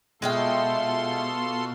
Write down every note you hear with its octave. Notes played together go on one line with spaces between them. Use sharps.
B2 G#3 F4 A4 E5 F5 G5 C6